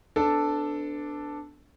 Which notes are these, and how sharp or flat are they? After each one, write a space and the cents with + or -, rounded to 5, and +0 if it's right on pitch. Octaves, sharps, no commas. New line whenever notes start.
B3 +30 D4 +0 A4 +0